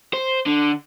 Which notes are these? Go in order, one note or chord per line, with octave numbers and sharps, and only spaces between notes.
C5
D3